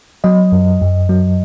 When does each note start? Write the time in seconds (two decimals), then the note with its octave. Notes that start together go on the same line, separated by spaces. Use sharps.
0.24 F#3 D#5
0.52 F#2
0.82 F#2
1.09 F#3